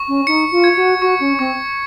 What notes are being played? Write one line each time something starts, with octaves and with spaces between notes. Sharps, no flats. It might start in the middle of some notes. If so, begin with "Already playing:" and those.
Already playing: C#6
C#4
D#4 C#7
F4
G#6
F#4
F#4 C#6
C#4
C4 C#6